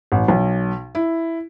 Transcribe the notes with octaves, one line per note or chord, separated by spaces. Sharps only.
A1
B1
E4